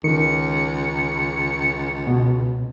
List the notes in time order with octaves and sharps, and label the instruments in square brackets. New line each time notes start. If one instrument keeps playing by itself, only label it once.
[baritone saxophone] C#2 [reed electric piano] D#3 [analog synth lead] C#7
[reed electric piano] B2